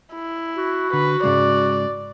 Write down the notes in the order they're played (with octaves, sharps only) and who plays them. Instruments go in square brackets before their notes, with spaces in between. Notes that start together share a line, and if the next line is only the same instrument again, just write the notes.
[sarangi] E4
[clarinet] F#4
[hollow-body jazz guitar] D3 [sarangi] B4
[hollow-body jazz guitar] G#2 C#3 G#3 [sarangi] D5